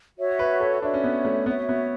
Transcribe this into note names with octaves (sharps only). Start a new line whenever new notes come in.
F#4 C#5 E5
B4
A4
D4 F#4 C#5 E5
C#4
B3
A3
B3 F#4 C#5 E5
B3